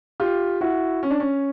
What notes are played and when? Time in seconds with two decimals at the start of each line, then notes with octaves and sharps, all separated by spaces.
0.20 F4 G4
0.61 E4 F#4
1.03 C#4
1.11 D4
1.20 C#4